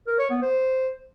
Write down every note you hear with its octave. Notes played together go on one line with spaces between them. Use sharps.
A#4
C#5
B3
C5